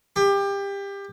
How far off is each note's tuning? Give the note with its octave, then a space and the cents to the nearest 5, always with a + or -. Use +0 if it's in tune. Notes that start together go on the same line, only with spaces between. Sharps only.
G4 +25